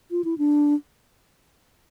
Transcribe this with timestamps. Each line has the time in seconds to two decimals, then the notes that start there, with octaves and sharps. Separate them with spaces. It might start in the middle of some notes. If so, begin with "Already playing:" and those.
0.11 F4
0.24 E4
0.38 D4